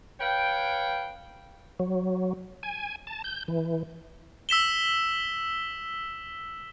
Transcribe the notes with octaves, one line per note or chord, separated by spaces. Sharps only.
B4 C#5 F5 G5
F#3
G#5
A5
G6
E3
E6 B6 E7 G7